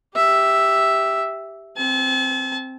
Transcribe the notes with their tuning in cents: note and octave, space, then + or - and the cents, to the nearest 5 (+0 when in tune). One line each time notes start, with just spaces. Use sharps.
G4 +0 E5 +0
C4 +0 A5 -40